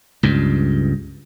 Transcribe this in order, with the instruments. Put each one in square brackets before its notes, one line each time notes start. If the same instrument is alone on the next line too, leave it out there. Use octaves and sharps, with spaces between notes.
[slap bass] C#2 G2